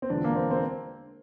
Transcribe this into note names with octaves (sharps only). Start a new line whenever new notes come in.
C4
E1 E2 D3 F3 D4
A#3
C4
C4